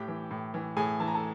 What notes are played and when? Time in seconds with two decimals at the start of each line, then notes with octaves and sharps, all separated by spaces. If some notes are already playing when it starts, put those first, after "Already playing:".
Already playing: A2 G4 G5
0.08 E3
0.31 A2
0.54 E3
0.77 A2 G#4 G#5
1.00 E3 A5
1.07 A#5
1.14 A4 A5